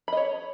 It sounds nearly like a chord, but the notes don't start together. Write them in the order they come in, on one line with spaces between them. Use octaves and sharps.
B5 D#5 C#5